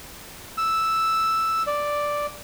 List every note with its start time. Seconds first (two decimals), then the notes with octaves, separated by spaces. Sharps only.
0.58 E6
1.67 D5